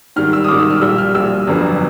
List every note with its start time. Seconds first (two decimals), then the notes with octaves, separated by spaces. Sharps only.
0.16 G#2 D#3 G3 F6
0.33 E6
0.44 D#6
0.48 G#2 D#3 G3 D6
0.60 E6
0.70 F6
0.82 A#1 A#2 G3 E6
0.98 F6
1.15 A#1 A#2 G3 E6
1.47 G1 F2 D3 F#3 B3